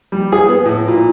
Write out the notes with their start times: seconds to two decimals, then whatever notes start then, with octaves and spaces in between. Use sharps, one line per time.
0.12 G3
0.32 G#4
0.48 B3
0.65 A2
0.88 A#2